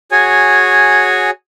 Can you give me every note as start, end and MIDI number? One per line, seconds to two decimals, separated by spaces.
0.12 1.30 66
0.12 1.30 68
0.12 1.30 73
0.12 1.30 80